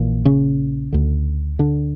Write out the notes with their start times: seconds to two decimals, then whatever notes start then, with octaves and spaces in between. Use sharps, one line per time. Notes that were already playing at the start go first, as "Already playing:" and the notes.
Already playing: A#1 A#2 E3
0.25 C#3 C#4
0.93 D2 D3
1.59 D3 D4